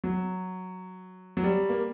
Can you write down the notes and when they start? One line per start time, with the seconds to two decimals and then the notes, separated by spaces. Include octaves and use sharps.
0.04 F#3
1.37 F#3
1.44 G3
1.69 A#3